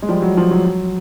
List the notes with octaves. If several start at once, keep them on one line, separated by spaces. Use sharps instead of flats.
G#3
F3 G3
F#3
F3
F#3
F#3